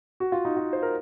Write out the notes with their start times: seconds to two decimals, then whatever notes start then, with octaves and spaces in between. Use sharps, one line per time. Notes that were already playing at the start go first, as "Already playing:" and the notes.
0.20 F#4
0.32 F4
0.45 D#4
0.57 F4
0.73 C5
0.83 A#4